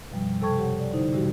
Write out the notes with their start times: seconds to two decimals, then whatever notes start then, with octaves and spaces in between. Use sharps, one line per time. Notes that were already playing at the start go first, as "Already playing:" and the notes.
0.10 F#2 B2 F3 G3
0.41 C3 A4 G5 A5 C#6 G#6
0.58 G4 A4 C#5 F#5
0.79 D5
0.93 D3 D#4 E4 C5
1.12 A2 C3 E3 G3 F#4 G4